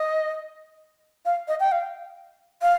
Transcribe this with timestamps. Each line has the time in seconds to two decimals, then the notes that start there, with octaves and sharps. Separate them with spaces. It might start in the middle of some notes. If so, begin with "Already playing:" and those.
Already playing: D#5
1.25 F5
1.48 D#5
1.60 G5
1.72 F5
2.62 F5